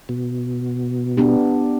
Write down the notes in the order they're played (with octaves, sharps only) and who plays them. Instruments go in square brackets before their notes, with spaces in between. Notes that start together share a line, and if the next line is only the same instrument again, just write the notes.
[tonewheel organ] B2
[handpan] B3 D4 G4